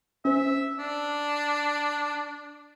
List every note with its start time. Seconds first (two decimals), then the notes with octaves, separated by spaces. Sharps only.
0.25 C#4 C5 E5
0.79 D4